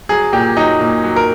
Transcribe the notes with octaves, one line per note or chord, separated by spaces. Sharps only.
F#3 G#4
A#2 G4
F#3 D#4
A#2
F#3
A#4